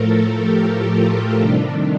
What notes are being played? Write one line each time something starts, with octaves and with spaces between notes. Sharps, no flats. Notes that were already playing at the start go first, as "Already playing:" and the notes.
Already playing: A2 F3 A3 A4 A#4
G4
F4
C3 D#3 G3 D4